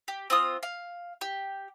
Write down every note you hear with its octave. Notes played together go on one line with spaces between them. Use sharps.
G4
C4 F4 D#6
F5
G4